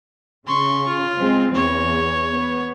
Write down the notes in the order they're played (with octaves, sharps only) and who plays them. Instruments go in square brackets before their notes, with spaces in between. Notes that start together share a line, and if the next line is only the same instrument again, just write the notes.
[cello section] C#3 [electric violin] C6 C#6
[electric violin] F4
[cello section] G#3 C4
[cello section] E2 [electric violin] C#5
[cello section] B3